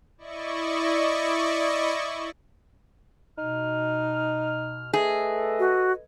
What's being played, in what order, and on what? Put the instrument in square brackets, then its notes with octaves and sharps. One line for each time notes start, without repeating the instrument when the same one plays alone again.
[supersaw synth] E4 D5 D#5 C#6
[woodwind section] B2 F6 [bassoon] D#4
[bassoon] A3 [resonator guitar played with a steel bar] G#4 [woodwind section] A4 B4 D#5
[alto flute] F#4